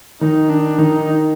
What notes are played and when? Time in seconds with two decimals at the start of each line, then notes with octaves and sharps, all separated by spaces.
0.21 D#3 D#4
0.49 D4
0.78 D#3 D#4